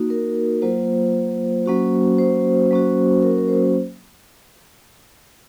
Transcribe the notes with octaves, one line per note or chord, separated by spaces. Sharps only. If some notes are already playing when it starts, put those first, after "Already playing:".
Already playing: A#3 D#4 F#4
A#4
F#3 A#3 F4 C5
F#3 A#3 C#4 F#4
C5
F#3 A#3 C#4 F#4
A#4
A#4
C5